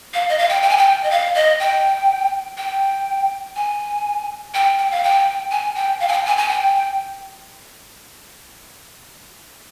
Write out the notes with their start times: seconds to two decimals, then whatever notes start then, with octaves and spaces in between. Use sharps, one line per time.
0.14 F5
0.29 D#5
0.38 F5
0.50 G5
0.62 G5
0.70 G#5
0.77 G5
1.04 D#5
1.11 F5
1.35 D#5
1.60 G5
2.57 G5
3.56 G#5
4.54 G5
4.78 G5
4.91 F5
5.04 G5
5.51 G#5
5.76 G5
6.00 F5
6.08 G#5
6.12 G5
6.26 G#5
6.38 G#5
6.49 G5